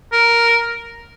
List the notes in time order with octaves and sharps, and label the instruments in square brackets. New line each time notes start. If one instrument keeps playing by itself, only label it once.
[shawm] A#4